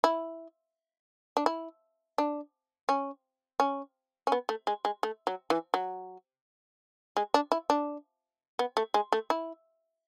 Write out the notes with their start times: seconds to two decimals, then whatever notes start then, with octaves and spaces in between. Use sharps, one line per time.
0.04 E4
1.37 D4
1.46 E4
2.18 D4
2.89 C#4
3.60 C#4
4.27 C#4
4.32 B3
4.49 A3
4.67 G#3
4.85 G#3
5.03 A3
5.27 F#3
5.50 E3
5.74 F#3
7.17 G#3
7.34 D4
7.52 E4
7.70 D4
8.59 B3
8.77 A3
8.94 G#3
9.12 A3
9.30 E4